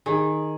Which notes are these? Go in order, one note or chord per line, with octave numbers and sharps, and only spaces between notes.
D#3 G#4